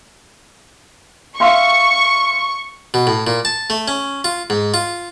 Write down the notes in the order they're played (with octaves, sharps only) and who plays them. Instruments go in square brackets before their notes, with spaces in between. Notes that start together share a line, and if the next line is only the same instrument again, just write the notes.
[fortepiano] E5 F5 C6 [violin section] C#6
[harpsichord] B2
A2
A#2
A5
A3
C#4
F4
G#2
F4